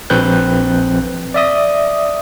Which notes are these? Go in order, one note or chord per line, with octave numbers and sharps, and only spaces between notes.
A#1 F3 C4 B4 F#6 G6
D5 E5 D#6